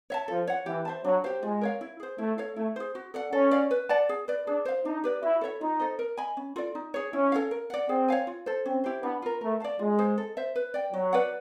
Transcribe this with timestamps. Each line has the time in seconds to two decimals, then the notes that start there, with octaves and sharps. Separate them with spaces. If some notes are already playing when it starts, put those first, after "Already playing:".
0.10 C#5 E5 A5
0.28 F3 A4
0.47 C#5 F#5
0.66 E3 G4
0.85 C5 E5 A5
1.04 F#3 D4
1.24 G4 C5 F5
1.42 G#3 F4
1.61 A#4 C#5 F5
1.81 E4
2.00 G#4 C5
2.18 A3 E4
2.38 A4 C#5 F5
2.56 A3 E4
2.76 G#4 C5
2.95 F#4
3.14 A4 D5 F#5
3.32 C#4 A4
3.51 D5 F5
3.71 B4
3.89 D5 F#5 A5
4.09 G#4
4.28 B4 D5
4.47 D4 G#4
4.65 C5 F5
4.85 D4 D#4
5.04 G4 B4 D5
5.22 E4 F#4
5.41 A4 C#5 E5
5.61 D#4 F4
5.80 A4 C5 D#5
5.99 A#4
6.17 D#5 G#5 B5
6.37 C#4
6.56 F4 A4 D5
6.75 D#4
6.94 G#4 C#5
7.13 C#4 E4
7.32 A4 C#5 F5
7.51 A#4
7.70 D5 F#5
7.89 C4 G#4
8.08 C#5 F5 G#5
8.27 F4
8.46 A4 C5
8.66 C4 C#4
8.84 E4 G4 C5
9.03 B3 D4
9.22 F4 A#4
9.41 A3 A#4
9.60 D5 F5 A5
9.79 G#3 F4
9.99 G#4 C5
10.18 A4
10.37 C5 E5
10.56 B4
10.74 D5 G5
10.93 F#3 F#4
11.13 B4 D5 F#5